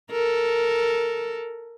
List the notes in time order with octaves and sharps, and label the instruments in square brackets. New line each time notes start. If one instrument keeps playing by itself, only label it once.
[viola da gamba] A4 A#4